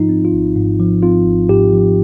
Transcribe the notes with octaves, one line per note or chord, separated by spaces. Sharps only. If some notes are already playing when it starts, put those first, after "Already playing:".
Already playing: G#2 F3 D#4 F4
C4
F4
G#1
G#2
F3
C4 F4
G#1
G#2 G4
F3